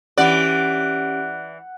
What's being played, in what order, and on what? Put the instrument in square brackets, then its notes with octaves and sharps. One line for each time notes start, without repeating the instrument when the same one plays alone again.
[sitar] E3 D5 [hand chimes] C#4 G4 D7 [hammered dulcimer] F#5